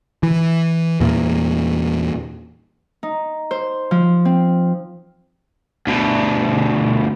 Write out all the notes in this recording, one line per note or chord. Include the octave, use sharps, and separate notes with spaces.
E3
E2 A#2
D#4
C5
F3
C4
D2 B2